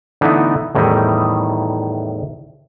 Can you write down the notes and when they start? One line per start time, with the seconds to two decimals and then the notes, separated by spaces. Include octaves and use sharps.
0.21 D3 E3 A3 B3 D#4 E4
0.75 E2 A2 D#3 G3 D#4 E4